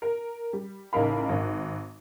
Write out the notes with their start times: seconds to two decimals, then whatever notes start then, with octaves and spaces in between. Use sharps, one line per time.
0.02 A#4
0.53 G3
0.93 A1 C#3 D#4 A#4 F5 B5
1.29 G#1